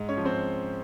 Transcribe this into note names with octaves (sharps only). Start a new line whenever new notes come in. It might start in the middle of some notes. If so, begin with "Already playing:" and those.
Already playing: G#2
C#4 C#5
F3
C4 C5